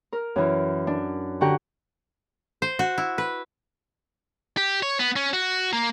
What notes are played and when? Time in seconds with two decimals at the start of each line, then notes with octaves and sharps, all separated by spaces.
0.12 A#4
0.36 F#2 E3
0.87 D4
1.41 D3 F#4 G4 F#5 A#5
2.62 C5
2.79 F#4
2.98 E4
3.18 B4
4.57 G4
4.83 C#5
4.99 B3
5.16 C#4
5.33 F#4
5.73 A#3